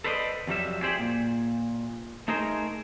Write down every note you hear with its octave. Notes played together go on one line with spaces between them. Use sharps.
A4 B4 C5 D5 D#5
F2 F#3 G3 E5
G4 G#4 C5 D5
A#2
A3 D#4 G#4 A#4 C5